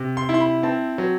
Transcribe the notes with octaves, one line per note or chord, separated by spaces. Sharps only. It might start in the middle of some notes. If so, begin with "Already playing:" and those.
Already playing: C3
C6
E4
C6
B5
C4 A5
F#3